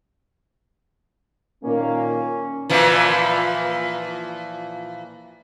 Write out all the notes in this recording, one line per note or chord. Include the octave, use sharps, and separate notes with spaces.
A#2 D#3 A#3 C#4
A#2 E3 F3